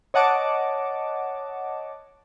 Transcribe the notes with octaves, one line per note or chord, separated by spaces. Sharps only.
C#5 D#5 F#5 A5 D6